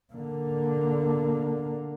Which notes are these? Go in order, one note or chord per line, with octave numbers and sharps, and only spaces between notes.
D3 A#3